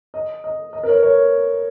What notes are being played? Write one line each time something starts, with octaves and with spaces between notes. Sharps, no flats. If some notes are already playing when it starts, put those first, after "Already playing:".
D#5
D#5
D#5
A#4
C#5
B4
C#5